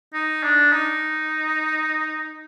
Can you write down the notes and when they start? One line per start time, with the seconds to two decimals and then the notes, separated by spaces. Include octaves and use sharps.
0.14 D#4
0.43 D4
0.73 D#4